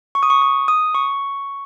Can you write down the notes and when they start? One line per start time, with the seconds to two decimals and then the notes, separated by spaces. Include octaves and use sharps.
0.15 C#6
0.23 D#6
0.30 C#6
0.42 D#6
0.68 D#6
0.95 C#6